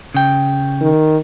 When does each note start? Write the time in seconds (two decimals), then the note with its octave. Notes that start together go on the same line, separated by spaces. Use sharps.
0.14 C#3 G5
0.81 D#3